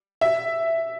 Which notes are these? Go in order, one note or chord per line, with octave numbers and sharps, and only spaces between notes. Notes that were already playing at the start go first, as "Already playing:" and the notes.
E5